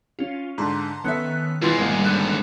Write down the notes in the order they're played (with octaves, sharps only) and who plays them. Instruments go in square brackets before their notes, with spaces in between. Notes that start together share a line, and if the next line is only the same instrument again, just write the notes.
[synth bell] C#4 F4
[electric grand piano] G#2 D3 [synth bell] A5 A#5 C6
[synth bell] D#3 C#4 F#6 [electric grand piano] B3 A4 E5
[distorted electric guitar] E2 G#3 [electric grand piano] E3 C6 A6 [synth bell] F4 G#6
[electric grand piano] G#1 A#3 [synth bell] G3
[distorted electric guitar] G#2 D3 [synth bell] F#6